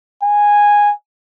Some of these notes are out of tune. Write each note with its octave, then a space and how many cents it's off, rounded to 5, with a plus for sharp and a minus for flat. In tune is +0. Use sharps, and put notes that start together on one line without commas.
G#5 -10